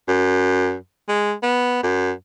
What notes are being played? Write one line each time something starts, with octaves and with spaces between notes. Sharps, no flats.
F#2
G#3
B3
F#2